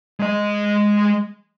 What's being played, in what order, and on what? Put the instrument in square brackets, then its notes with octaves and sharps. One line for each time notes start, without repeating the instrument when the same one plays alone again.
[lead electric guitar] G#3 D#5